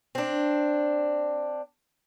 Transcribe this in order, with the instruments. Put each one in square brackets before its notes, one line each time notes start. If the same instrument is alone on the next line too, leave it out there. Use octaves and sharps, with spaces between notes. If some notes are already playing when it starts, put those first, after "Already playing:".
[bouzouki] C4 D4